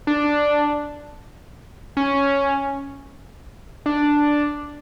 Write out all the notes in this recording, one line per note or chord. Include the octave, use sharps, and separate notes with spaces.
D4
C#4
D4